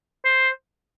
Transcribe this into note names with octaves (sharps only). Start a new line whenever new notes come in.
C5